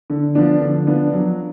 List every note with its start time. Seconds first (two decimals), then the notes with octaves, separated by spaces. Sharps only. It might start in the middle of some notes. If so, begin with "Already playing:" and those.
0.10 D3
0.35 F3 B3 D4
0.61 D3
0.87 F3 B3 D4
1.13 F#3